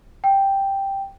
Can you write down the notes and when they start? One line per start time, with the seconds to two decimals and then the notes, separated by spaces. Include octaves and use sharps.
0.24 G5